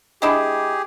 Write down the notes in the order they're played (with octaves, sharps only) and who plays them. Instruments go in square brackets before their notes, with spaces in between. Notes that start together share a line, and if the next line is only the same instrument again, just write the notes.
[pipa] G#3 D4 E4 [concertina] G4 G#4